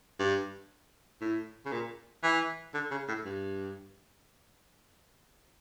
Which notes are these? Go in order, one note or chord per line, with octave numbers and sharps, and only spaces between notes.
G2
A2
C#3
A#2
E3
D3
C#3
A2
G2